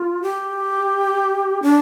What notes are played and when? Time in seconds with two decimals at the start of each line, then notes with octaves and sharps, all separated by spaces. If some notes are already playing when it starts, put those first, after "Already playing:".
Already playing: F4
0.22 G4
1.63 D4